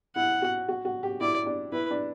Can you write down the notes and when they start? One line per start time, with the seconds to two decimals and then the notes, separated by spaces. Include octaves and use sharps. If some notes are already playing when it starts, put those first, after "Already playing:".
0.16 E4 F#5
0.42 F#4
0.68 F#4
0.85 F#4
1.03 G4
1.21 E4 D5
1.46 D4
1.72 E4 B4
1.91 D4